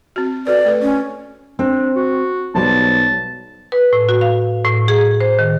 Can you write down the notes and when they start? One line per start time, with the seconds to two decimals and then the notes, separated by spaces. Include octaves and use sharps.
0.16 C4 F#4
0.47 F#4 A4 B4 D5
0.65 A3 A4 B4
0.82 C#4
1.59 C4 D4
1.96 F#4
2.55 B1 G3 C5 A5
3.72 B4
3.93 A2
4.09 F#4
4.21 F5
4.64 A2
4.88 G#4
5.21 C5
5.39 D#3